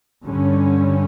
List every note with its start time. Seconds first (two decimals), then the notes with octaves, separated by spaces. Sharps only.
0.24 G2 D3 G3 C#4